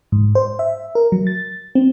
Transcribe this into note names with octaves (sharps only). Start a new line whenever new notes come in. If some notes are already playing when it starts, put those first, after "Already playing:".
G#2
C5
E5
A#4
F#3
A6
C4